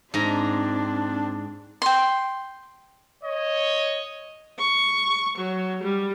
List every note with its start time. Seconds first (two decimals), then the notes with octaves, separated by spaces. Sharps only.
0.14 G#2 C4 D4 A#5
1.82 G5 C6
3.24 C#5 D#5
4.58 C#6
5.38 F#3
5.83 G3